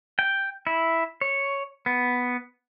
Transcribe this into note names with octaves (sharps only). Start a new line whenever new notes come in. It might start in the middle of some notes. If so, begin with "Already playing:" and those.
G5
E4
C#5
B3